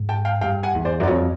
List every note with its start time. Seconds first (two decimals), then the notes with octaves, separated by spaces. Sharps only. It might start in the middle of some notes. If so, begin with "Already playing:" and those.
Already playing: G#2
0.09 G5 A5
0.25 F5 G5
0.41 G2 F5 G5
0.63 F#5 G#5
0.74 E2
0.85 C5 D5
1.00 F#2
1.03 D5
1.07 F2 C#5 D#5